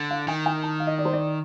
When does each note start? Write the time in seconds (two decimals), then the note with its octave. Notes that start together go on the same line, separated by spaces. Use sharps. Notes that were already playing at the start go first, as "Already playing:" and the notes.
Already playing: D3
0.10 F5
0.28 D#3 G5
0.46 G5
0.63 A5
0.80 F5
0.87 D#5
0.98 D5
1.05 C5
1.13 D5